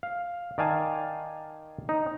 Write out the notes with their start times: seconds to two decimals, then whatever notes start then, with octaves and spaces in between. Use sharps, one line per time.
0.03 F5
0.58 D#3 D5 F5 G#5 A5
1.89 D#4